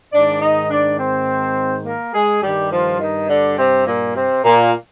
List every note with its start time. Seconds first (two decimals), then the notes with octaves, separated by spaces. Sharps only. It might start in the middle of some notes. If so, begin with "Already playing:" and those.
0.12 G#2 D#3 D4 D5
0.41 D#4 D#5
0.70 D4 D5
0.98 C4 C5
1.85 A#3 A#4
2.14 G#3 G#4
2.42 G2 D#3 G3 G4
2.71 F3 F4
3.00 D#3 D#4
3.29 D3 D4
3.57 C3 C4
3.86 A#2 A#3
4.15 C3 C4
4.44 A#2 A#3